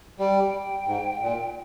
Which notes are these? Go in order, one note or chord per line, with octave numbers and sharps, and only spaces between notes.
G3 G5
G#2
A#2